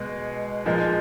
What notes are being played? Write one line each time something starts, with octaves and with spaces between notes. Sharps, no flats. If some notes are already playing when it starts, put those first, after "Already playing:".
Already playing: B2 G#3
A#2 F3 G#3